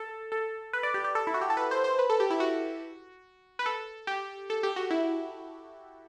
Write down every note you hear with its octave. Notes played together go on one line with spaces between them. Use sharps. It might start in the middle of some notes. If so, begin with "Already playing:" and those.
Already playing: A4
A4
B4
D5
G4
G4
A4
E4
F#4
G4
A4
B4
C5
C5
B4
A4
G4
E4
F#4
B4
A4
G4
A4
G4
F#4
E4